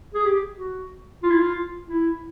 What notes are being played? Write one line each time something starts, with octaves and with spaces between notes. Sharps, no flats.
G#4
G4
F#4
F4
E4
F4
E4